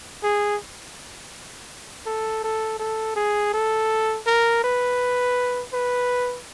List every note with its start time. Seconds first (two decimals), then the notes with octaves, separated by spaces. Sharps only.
0.23 G#4
2.06 A4
2.44 A4
2.80 A4
3.16 G#4
3.54 A4
4.27 A#4
4.64 B4
5.73 B4